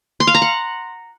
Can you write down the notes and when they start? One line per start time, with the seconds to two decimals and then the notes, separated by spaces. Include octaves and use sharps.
0.20 C6
0.27 F5
0.35 A#5
0.42 F#5